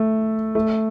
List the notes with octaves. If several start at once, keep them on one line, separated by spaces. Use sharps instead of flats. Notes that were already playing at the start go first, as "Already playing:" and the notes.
Already playing: A3
A3